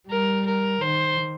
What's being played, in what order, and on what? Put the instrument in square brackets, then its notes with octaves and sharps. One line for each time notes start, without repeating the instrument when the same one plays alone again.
[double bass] G3 [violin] A#4
[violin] A#4
[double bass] D#3 [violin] C5